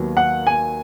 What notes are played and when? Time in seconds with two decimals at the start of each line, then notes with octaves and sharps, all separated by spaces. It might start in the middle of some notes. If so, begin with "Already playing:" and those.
Already playing: D#2 D#3 F#3 B3
0.17 F#5
0.47 G#5